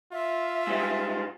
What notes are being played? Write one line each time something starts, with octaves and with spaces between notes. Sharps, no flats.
F4 E5
G#2 G3